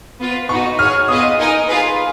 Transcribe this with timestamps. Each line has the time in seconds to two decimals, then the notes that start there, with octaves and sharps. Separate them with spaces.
0.19 B3 F4 B4
0.49 B3 D#4 F#4 C#6
0.78 G#4 C#5 F#5 F6
1.08 B3 F4 G#4 B4 D#5 D#6
1.38 D#4 A#4 D#5 G#5
1.67 F4 G#4 B4